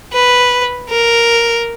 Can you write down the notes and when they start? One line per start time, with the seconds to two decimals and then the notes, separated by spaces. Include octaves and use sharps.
0.12 B4
0.89 A#4